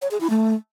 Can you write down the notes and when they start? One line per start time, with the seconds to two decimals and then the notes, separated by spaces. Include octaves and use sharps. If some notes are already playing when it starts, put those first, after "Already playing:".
0.02 C#5
0.11 G#4
0.21 E4
0.30 A3